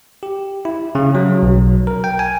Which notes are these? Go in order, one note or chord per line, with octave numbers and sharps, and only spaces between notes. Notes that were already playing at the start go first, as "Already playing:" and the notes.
G4
E4
C#3
F#3
B1
A#4
G5
G#5